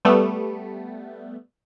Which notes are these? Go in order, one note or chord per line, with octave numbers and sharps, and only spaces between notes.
G3 A3 B3